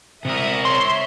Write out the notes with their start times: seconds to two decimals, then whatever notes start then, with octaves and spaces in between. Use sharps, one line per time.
0.25 C3 A#4 E5 D#6
0.65 C#5 E5 C6